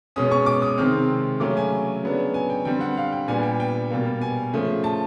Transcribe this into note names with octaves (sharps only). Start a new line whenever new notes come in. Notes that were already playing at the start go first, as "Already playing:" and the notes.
B2 G#3 C#4 D#6
C#6
D6
D#6
C3 D#3 G#3 C4 F6
C#3 F#3 A3 C#4 D6
G#5
C#3 F#3 B3 D4
G#5
G5
D3 G3 C4 G5
F#5
F5
G5
A#2 G3 B3 D4 G#5
G5
G5
B2 G3 A#3
G#5
C#3 F3 A3
A5